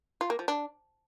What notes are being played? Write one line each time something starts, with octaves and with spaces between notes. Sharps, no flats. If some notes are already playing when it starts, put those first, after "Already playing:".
F4
A#3
F3
D4